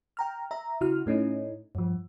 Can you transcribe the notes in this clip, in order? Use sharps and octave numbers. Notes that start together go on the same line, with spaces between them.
G5 A#5 F6
E5 A#5
C#3 E4 F#4 F6
A2 A3 C#4 D#4 E4
G2 F3